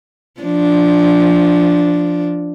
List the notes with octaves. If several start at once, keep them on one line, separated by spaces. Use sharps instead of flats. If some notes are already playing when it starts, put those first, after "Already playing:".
F3 D4